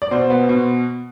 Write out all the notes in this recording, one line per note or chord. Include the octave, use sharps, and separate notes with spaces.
D5
B2 C5
B3
B2